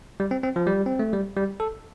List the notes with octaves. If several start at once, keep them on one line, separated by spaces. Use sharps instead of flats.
G3
C4
C4
F3
G3
C4
A3
G3
G3
A4